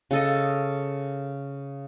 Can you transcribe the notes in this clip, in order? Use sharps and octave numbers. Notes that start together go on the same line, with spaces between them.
C#3 A4 D#5